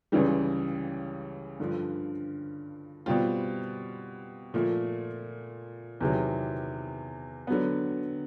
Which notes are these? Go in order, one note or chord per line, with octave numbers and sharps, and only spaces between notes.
C#2 C#3 E3 G3
G2 D3 F3
B2 G3 C4 F4
A#2 F3 A3
E2 C3 D#3 F#3
D3 F#3 B3